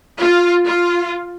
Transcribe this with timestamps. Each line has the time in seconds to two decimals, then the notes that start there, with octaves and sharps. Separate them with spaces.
0.19 F4
0.65 F4